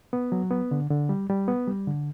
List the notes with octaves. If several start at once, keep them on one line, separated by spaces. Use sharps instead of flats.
B3
F#3
B3
D3
D3
G3
G3
B3
G3
D3